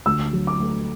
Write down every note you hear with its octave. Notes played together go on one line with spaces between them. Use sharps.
D2 E6
F#3
D6
A3